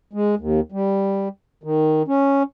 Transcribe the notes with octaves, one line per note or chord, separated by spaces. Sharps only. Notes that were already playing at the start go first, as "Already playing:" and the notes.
G#3
D#2
G3
D#3
C#4